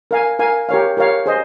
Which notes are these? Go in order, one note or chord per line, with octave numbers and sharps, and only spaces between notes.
A#4 F5 G#5
A#4 F5 G#5
G4 A#4 C#5 F5
G4 A#4 C#5 F5
G#4 C5 D#5